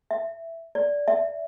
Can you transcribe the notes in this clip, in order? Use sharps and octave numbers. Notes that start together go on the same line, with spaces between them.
E5
D5
E5